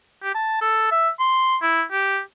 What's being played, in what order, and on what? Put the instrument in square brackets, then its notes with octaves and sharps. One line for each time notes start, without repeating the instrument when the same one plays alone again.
[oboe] G4
A5
A4
E5
C6
E4
G4